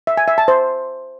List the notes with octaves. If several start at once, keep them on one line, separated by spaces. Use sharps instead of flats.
E5
G#5
E5
A5
C5